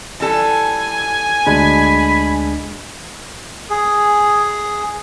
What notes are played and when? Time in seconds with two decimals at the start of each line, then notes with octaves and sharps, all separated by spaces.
0.20 E3 G3 A4 G#5
1.46 D2 G#3 D4 B5
3.70 G#4